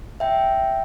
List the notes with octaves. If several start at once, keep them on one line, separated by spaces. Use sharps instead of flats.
E5 G5